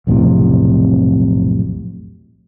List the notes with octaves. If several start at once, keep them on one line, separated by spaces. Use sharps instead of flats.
B1 F2 A2 C3